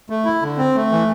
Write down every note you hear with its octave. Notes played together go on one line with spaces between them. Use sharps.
A3
E4
D3
C4
A3
E3